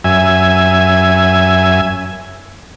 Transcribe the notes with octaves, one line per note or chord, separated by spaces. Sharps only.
F#2 E5 G#5